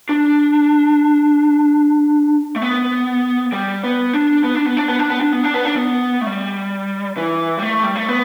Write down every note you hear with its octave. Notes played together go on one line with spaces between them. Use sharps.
D4
A3
B3
G3
B3
D4
B3
D4
B3
D4
B3
D4
B3
D4
B3
D4
B3
D4
B3
A3
G3
E3
G3
A3
G3
A3
B3